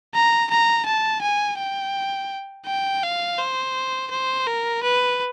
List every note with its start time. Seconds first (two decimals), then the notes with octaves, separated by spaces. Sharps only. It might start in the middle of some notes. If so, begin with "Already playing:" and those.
0.15 A#5
0.50 A#5
0.86 A5
1.22 G#5
1.58 G5
2.67 G5
3.04 F5
3.39 C5
4.11 C5
4.47 A#4
4.83 B4